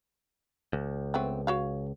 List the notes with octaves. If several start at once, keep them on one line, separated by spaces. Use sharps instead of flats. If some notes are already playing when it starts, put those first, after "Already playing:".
C#2
A3 B3 C4
F#4 C#5 F5